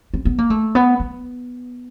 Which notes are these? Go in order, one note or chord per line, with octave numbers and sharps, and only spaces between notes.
C4
B3
A#3
A3
B3
B3